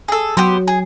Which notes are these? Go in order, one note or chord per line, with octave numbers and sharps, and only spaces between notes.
G#4 A4
F#3 B3 G4 C5
G#4